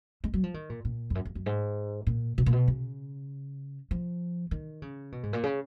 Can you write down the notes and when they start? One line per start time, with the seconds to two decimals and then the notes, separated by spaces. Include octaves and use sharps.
0.24 G#3
0.34 F#3
0.44 F3
0.54 D#3
0.70 A#2
0.85 A#2
1.10 F2
1.15 F#2
1.25 F2
1.35 F#2
1.46 G#2
2.07 A#2
2.38 B2
2.46 A#2
2.52 B2
2.68 C#3
3.91 F3
4.51 D#3
4.82 C#3
5.12 B2
5.23 G#2
5.33 A#2
5.43 C#3